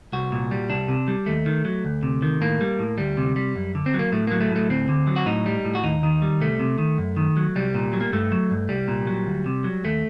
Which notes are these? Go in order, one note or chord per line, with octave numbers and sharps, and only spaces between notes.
C2 F#4
A#2
G3
C2 D4
C3
G3
D#2 A3
D#3
F#3
D2
C3
D#3
A2 A#3
G3
A2
D2 G3
C3
G3
F#2
D3
C4
F#3
A#3
A2 A3
F#3 A#3
A3
A2 A3
D2 C4
D3
F#3
F#4
A2 D#4
G3
A2
F#4
D#2 D#4
D#3
G3
C2 A3
C3
D#3
F#2
D#3
F#3
C2 G3
A#2
F#3
A#3
G2 A3
F#3
G2
C2 G3
A#2
F#3
D2
C3
F#3
D#2 A3